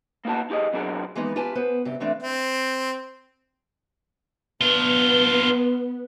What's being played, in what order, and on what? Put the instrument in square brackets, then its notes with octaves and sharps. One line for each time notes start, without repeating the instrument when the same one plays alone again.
[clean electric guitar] A#3 B3 D#4 F#4 A5
D#4 G4 G#4 D#5
B2 F#3 D4 F#4 G#4 A#4
[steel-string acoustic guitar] E3 F3 G#3 A#3 B3 D#4
E4 F4 G4 B4 G#5 A5
B3 B4 C5
G2 C3 G4
E3 A3 B3 C4 D4
[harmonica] C4
[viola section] B3 [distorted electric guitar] D4 F4